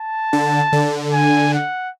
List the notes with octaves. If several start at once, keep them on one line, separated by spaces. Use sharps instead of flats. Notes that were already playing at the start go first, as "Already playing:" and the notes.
Already playing: A5
D3
D3
G#5
F#5